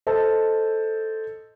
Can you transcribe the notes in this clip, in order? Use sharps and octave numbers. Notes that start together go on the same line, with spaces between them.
A4 C5 D#5 A5